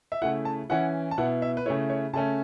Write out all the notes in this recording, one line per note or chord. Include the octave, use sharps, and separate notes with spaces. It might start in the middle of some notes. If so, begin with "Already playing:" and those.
E5
C#3 A3 E4 F#5
A5
E3 C#4 E4 F#5
A5
B2 B3 E4 F#5
E5
B4
C#3 A3 E4 C#5
C#5
C#3 A3 C#4 A5